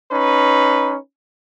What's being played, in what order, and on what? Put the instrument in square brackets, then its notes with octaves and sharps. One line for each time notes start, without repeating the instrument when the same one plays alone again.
[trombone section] C#4 D#4 B4